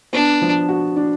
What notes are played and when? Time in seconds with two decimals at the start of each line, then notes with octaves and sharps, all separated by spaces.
0.13 B3 D4
0.42 F3
0.69 F#4
0.96 D4